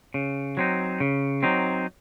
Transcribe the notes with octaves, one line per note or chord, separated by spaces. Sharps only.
C#3
F#3 C4 D#4
C#3
F#3 C4 D#4